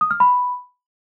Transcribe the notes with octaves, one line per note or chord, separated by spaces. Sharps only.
D#6
F6
B5